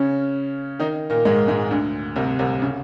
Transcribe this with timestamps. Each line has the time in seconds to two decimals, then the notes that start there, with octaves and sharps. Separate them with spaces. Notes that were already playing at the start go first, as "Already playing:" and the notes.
Already playing: C#3 C#4
0.80 D#3 D#4
1.10 A#2 A#3
1.25 G#2 G#3
1.48 G#2 G#3
1.71 D2 D3
2.16 C2 C3
2.39 C2 C3
2.62 C#3